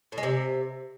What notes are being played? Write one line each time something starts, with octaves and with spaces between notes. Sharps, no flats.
A2
G#3
C3